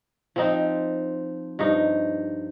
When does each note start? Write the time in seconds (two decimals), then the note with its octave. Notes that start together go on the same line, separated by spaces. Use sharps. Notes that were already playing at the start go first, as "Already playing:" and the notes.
0.36 F3 C4 D#4
1.59 G2 F3 D#4